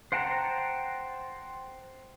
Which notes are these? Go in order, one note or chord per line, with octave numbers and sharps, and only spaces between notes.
C5 F#5 G5 A5 A#5